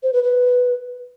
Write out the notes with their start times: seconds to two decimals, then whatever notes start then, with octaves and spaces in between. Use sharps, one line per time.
0.03 C5
0.13 B4
0.23 B4